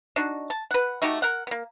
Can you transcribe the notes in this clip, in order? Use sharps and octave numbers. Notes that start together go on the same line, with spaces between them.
D4 D#4 F#4
A5
B4 F#5
A3 D#4 F#4 G4
A#4 F#5
A#3 B3